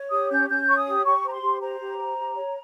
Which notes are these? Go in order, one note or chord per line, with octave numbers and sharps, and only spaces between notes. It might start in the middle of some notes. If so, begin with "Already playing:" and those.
Already playing: C#5
G4 D#6
C#4 G6
C#4 G6
C#5 C#6
D#6
G4
G4 C#6
C5
A#5
C6
G4
C5 A#5
G4
C5
G4
C#5